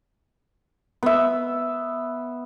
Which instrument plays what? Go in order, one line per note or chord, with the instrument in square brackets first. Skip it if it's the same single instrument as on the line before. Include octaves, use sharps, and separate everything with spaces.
[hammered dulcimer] B3 E5